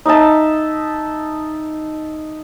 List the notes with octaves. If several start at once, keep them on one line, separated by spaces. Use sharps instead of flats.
D#4 D#5 E5 A5